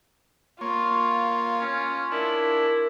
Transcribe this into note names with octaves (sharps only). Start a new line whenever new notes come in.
A#3 F4 C#5 C#6
C#4
D4 E4 A#4